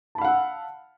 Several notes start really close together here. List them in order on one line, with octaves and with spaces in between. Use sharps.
A5 B5 F5 F#5 E6